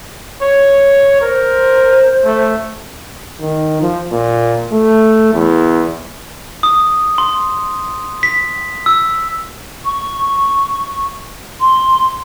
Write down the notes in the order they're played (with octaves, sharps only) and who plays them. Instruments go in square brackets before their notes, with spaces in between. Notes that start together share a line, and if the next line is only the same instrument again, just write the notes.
[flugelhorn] C#5
[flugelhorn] A#4 [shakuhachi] C5
[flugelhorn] A3
[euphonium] D#3
F3
A#2
A3
E2
[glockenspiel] D#6
C6
B6
E6
[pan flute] C#6
C6